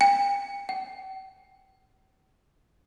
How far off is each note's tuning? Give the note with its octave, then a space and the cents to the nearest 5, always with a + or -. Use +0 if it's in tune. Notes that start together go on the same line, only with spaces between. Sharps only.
G5 +40
G5 -45